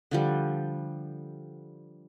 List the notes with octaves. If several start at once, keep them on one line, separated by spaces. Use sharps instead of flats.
D3 F3 G3